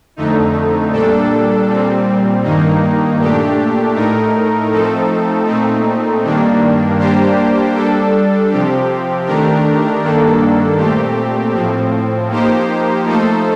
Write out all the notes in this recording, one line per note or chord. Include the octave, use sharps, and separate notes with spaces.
F2 D3 A3 D#4
A#2 G3 D4 A4
A#2 G3 C4
G2 D#3 A#3 D#4
A#2 A3 D4 G4
A2 A3 D#4 A#4
F3 A3 C4 D#4 A4
A#2 A3 C4 D#4
G2 D#3 G3 A#3 D4
G3 A#3 D4 G4 C5
G3 D4 A4
C3 F3 C4 G4
D#3 A3 D4 G4 A#4
G2 D#3 A#3 D4 A4
A#2 A3 C4 G4
A2 F3 C4
F3 A#3 D#4 G4 C5
F3 A3 D#4 A4 C5